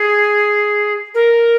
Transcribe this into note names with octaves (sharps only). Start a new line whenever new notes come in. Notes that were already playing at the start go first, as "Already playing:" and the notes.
Already playing: G#4
A#4